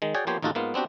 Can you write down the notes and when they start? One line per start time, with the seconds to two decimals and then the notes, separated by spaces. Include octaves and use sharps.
0.02 D#3 G#3
0.14 F#4 G#4 C#5 D5 G5
0.27 F3 A#3 B3 G4 C5 C#5
0.42 A1 D#2 D#4 F4 F#4 A4
0.55 G#2 A#3 B3 F4
0.74 B3 C4 D4 F#4 G4